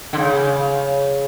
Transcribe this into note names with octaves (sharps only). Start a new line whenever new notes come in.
D3
C#3